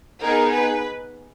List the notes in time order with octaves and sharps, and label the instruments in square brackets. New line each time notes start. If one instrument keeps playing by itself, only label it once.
[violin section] B3 D#4 G#4 A#4
B4